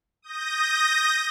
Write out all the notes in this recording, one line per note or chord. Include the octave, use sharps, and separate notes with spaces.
D#6 G6 A#6